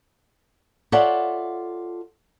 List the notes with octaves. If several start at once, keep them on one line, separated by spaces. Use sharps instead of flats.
F4 A4 C#5 D5 E5 F#5